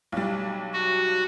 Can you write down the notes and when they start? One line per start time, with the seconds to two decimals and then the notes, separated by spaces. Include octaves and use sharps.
0.12 B1 G3
0.73 F#4